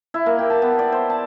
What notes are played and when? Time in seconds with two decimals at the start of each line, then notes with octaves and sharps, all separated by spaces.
0.14 E4
0.26 A#3
0.39 G4
0.50 A5
0.62 B3
0.79 D5
0.92 C5
1.10 A5